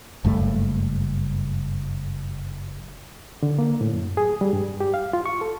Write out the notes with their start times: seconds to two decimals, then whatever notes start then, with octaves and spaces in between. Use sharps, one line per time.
0.25 F#1 G2 A3
3.43 D3
3.59 A#3
3.81 A2
3.93 F#2
4.17 G#4
4.41 G3
4.53 G2
4.80 G4
4.94 F5
5.13 F4
5.26 C#6
5.41 A4